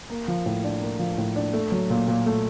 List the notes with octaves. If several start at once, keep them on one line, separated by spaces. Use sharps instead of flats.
A#3
F3
A2
D4
A#3
F3
A2
D4
A3
F#3
A#2
A#2
A3